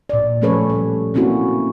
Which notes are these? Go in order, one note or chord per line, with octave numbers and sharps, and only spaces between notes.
A#2 D5
F3 A3 C#4 A4 B4 C#5
G3 A3
A#3 C4 C#4 E4 F#4